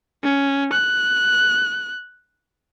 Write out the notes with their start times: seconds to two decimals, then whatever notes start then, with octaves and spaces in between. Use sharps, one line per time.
0.24 C#4
0.73 F#6